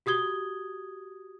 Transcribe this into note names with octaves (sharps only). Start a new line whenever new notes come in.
F#4 G4 D#6 G#6 G7